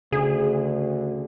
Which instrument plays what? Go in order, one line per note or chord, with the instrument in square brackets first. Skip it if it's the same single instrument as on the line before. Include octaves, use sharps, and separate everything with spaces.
[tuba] D2 [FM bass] C#3 [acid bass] G#4